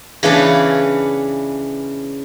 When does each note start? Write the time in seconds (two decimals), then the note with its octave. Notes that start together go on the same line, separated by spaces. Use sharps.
0.23 C#3 E3 B3 C#4 D4 C#5